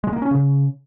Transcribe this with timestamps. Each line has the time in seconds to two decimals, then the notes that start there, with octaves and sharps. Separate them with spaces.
0.04 G#3
0.13 A#3
0.22 C#4
0.31 C#3